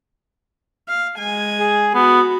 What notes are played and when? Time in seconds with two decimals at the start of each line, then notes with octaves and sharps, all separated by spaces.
0.88 F5
1.18 G#3 G#5
1.60 G#4
1.94 B3 F#4